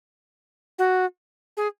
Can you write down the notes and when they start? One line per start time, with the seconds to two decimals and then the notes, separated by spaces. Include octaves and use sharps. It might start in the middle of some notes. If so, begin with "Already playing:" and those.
0.79 F#4
1.57 G#4